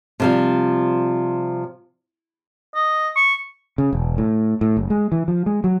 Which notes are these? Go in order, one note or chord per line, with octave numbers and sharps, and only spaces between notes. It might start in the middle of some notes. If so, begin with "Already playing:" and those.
C3 F3 G3
D#5
C#6
C#3
E1
A2
A2
F#1
G#3
E3
F3
G#3
F#3